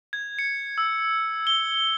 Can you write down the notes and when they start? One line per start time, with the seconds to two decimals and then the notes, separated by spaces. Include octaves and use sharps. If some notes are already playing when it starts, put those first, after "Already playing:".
0.13 G#6
0.39 C#7
0.78 E6
1.47 G7